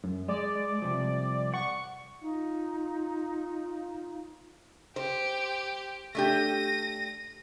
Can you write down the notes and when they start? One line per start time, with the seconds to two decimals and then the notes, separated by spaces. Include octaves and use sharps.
0.04 F#2
0.28 G#3 D5
0.82 C2 C3 F3
1.54 F#5 C#6
2.22 D#4 F4
4.96 G4 C5
6.15 A3 D4 G4 A#6 D#7